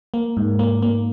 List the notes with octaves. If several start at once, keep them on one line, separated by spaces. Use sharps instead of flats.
A#3
G#2
A#3
A#3